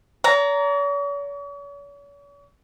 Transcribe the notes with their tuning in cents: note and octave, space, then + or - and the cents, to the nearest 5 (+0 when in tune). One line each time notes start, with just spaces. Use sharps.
C#5 +45 A#5 +0